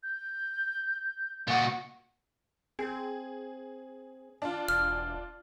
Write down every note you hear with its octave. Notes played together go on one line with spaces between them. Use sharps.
G6
A#2 F#4
C4 G#4
D4 F4
E1 F6